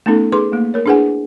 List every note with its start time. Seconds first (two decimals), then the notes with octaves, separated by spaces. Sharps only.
0.06 A3 B3 C#4 D#4 A4
0.32 D#4 G#4 B4 C6 D6
0.52 A3 A#3
0.74 A#4 C#5
0.86 D4 E4 G#4 B4 F#5 G#5